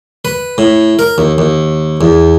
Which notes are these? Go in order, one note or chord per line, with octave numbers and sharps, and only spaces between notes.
B4
A2
A#4
D#2
D#2
E2